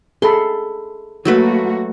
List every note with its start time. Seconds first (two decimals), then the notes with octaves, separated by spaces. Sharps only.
0.22 G#4 A4 B5 C6
1.25 F#3 A3 A#3 F#4 B4